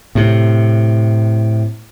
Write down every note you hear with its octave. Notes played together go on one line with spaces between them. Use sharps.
A2 C3